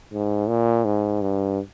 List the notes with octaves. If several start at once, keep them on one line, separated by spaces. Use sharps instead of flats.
G#2
A#2
G#2
G2